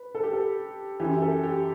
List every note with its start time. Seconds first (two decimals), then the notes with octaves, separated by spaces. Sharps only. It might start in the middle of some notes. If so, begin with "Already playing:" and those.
Already playing: B4
0.15 A4
0.23 G4
0.33 A4
1.00 F#2 E3 G4
1.22 A4
1.43 G4